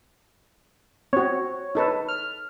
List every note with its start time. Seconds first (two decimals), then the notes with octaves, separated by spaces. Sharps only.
1.13 C4 F#4 C#5
1.75 D#4 A4 B4
2.08 F6